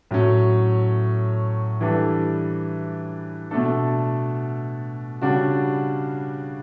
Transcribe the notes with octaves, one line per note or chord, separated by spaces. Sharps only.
A2 F#3 C#4
E3 G3 D4 A4
B2 A3 D4 A4
C#3 G3 D4 F#4